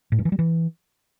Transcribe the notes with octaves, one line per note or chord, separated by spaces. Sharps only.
A2
G2
E3
G3
E3